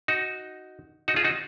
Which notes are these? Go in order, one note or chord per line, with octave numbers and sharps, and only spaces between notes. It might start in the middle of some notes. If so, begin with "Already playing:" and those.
D#4 F#4
D#4 F#4
F4 G#4
D#4 F#4